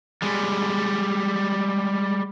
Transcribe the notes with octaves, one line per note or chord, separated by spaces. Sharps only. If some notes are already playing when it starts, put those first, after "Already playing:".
G3 G#3